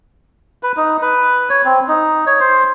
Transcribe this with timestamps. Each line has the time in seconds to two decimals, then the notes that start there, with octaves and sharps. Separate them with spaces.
0.63 B4
0.77 D#4
1.02 B4
1.50 C#5
1.65 C4
1.88 D#4
2.27 C#5
2.40 C5